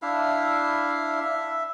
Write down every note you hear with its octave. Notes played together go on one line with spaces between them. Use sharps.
D4 E4 E5 F5
E5